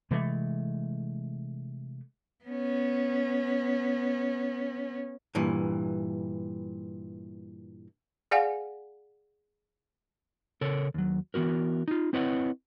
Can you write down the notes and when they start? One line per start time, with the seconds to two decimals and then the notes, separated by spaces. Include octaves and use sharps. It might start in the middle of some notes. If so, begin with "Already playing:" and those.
0.11 C3 E3 G#3 A3
2.45 B3 C#4
5.35 G2 A#2 E3
8.31 G#4 D5 F5 F#5 G#5
10.61 C#3 A4 A#4 C#5
10.94 D#2 F#3
11.34 E3 B3 F#4 A#4
11.88 D#4 F4
12.13 C4 E4 B4 C#5 D#5 F#5